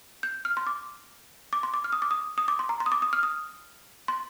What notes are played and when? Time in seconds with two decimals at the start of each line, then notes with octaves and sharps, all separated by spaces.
0.23 G6
0.45 F6
0.57 C6
0.67 D6
1.53 D6
1.63 C6
1.74 D6
1.84 F6
1.93 D#6
2.02 D6
2.11 D#6
2.38 D#6
2.48 D6
2.59 C6
2.69 A#5
2.80 C6
2.86 D#6
2.92 D6
3.02 D#6
3.13 F6
3.23 D#6
4.08 C6